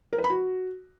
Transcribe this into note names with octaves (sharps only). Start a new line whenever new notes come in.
A#4
B4
B5
F#4